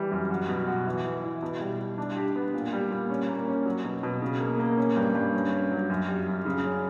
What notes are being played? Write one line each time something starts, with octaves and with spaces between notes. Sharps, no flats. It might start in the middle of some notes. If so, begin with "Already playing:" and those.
Already playing: E3 G3
F#2
F#4
B2
F#4
E3
E3
E4
B2
G3
G3
D4
G4
B3
A#2
G3
A#2
C#4
A#3
C#4
F#3
B2
B2
C#3
A#3
A#3
C#4
G2
G2
C#4
C#4
F#3
F#2
G3
F#2
C#3
C#4